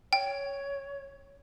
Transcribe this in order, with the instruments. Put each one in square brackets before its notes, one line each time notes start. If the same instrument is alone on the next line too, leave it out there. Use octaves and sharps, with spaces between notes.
[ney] C#5 [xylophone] G5